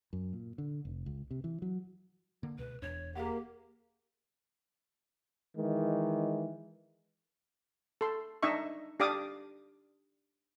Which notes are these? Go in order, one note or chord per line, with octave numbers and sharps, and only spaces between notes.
F#2
A#2
D3
F1
C#2
C3
E3
F#3
D3 A#3
C#2 B2 B4
E1 E2 D4 C#5
A#3 G4 G#4 F5 F#5
D#3 E3 G#3
A4 C6
D4 D#4 D#5 E5 C#6
D4 G4 D5 F5 D6 D#6